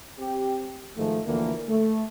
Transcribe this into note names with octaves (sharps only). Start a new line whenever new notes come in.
C4 G4
G#2 D#3 F3 A3
D2 D3 E3 F3 A#3
A3